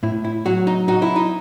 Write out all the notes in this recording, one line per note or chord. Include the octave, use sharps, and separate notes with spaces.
A2 E4
E4
F#3 F#4
D#4
D#4 F#4
E4
D#4